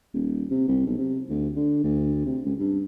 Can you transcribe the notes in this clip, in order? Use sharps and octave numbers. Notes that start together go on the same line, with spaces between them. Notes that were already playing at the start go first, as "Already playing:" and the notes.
D#1
C3
C2
B1
C3
D2
D3
D2
C3
C#2
G2